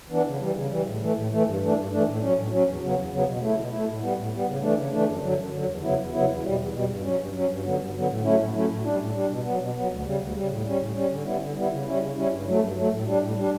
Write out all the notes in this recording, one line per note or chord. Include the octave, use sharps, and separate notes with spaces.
E3 B3 D4
C#3
E3 G3
C#3
E3 G3
A2
E3 A3
A2
E3 A3
G2
E3 A3 D4
G2
E3 A3 D4
A2
F#3 C#4
A2
F#3 C#4
E2
C#3 F#3 B3
E2
C#3 F#3 B3
B2
A3 E4
B2
A3 E4
A2
G3 B3
A2
G3 B3
C#3
E3 A3 D4
C#3
E3 A3 D4
F#2
D3 F#3
F#2
D3 F#3
E2
C#3 F#3 B3 E4
E2
C#3 F#3 B3 E4
E2
B2 G3
E2
B2 G3
G2
F#3 C#4
G2
F#3 C#4
G2
D3 F#3 B3
G2
D3 F#3 B3
A2
F#3 A3 C#4 E4
A2
F#3 A3 C#4 E4
A2
G3 D4
A2
G3 D4
B2
F#3 B3
B2
F#3 B3
D2
C#3 G3
D2
C#3 G3
A2
G3 C#4
A2
G3 C#4
D3
G3 B3 E4
D3
G3 B3 E4
C#3
G3 C#4 E4
C#3
G3 C#4 E4
G2
F#3 A3
G2
F#3 A3
A2
G3 D4
A2
G3 D4